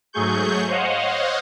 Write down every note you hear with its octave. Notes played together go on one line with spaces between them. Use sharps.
G#2 F#3 A3 G#4 C#6 G6
C5 C#5 D#5 F5 F#5